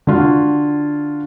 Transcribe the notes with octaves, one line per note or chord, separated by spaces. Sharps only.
D3 F4 F#4